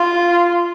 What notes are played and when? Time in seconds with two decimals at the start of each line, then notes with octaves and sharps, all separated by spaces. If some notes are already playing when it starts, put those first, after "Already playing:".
Already playing: F4